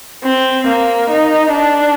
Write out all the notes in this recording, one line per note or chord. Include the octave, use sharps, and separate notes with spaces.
C4
A#3
D#4
D4